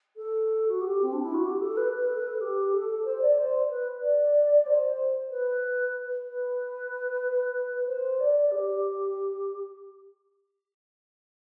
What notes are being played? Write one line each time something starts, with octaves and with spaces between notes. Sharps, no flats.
A4
F#4
G4
C4
D4
E4
F#4
G4
A4
B4
B4
A4
B4
A4
G4
A4
A4
C5
D5
C5
B4
D5
C5
B4
B4
C5
D5
G4